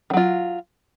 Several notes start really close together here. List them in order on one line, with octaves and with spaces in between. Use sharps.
D#3 F#3 F4